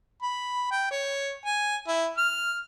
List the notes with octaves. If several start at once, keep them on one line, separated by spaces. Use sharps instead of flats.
B5
G5
C#5
G#5
E4
F6